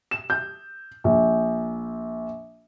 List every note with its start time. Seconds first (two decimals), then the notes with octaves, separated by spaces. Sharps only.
0.11 E7
0.30 G6
1.04 A#1